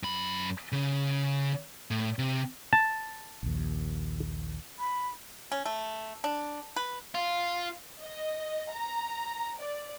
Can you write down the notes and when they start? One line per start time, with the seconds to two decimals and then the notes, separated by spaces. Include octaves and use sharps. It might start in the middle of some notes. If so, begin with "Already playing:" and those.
0.03 F#2 B5
0.72 C#3 C#4
1.91 A2
2.19 C3
2.73 A5
3.43 A#1 D#2
4.79 B5
5.52 C#4
5.65 A3
6.24 D4
6.76 B4
7.15 F4
8.01 D#5
8.74 A#5
9.60 D5